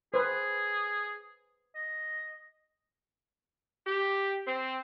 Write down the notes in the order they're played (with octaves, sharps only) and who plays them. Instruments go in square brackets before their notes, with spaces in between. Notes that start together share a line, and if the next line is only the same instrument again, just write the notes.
[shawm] G#4 [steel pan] B4 C5
[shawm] D#5
[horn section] G4
C4